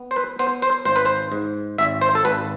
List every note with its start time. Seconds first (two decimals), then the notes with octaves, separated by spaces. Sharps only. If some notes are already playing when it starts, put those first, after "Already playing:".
Already playing: B3
0.11 C5
0.16 B4
0.39 B3 C5
0.62 C5
0.85 G#1 C5
0.96 B4
1.05 C5
1.32 G#2
1.78 G#1 E5
2.01 C5
2.15 A4
2.25 G#1 B4